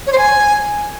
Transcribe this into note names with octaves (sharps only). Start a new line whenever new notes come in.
C#5
C5
G#5